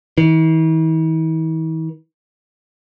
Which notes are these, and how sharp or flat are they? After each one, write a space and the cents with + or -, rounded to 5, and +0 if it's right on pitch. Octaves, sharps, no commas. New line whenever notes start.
E3 -45